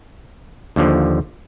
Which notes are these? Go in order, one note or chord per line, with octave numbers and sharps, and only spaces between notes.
D#2 D3 F3